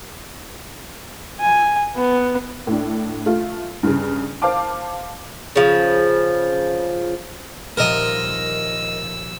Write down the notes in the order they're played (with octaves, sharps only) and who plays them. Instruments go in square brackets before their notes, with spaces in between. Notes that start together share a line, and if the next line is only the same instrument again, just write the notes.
[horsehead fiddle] G#5
B3
[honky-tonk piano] A2 D4
A3 F4
G2 C#3
C5 F5 A5 D6
[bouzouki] C#3 F3
[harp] D#1 F3 D7 [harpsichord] A#4 D#5 [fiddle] E6